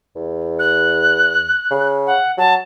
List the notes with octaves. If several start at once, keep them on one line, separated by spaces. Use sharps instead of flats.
E2
F#6
C#3
F#5
F#3 A5